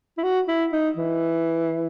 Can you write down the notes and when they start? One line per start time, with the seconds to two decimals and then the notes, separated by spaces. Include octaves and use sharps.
0.17 E4
0.23 F#4
0.48 E4
0.72 D#4
0.96 E3